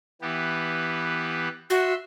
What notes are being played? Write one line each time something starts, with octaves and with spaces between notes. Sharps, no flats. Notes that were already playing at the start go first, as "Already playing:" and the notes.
E3 B3 G4
F#4 E5 C6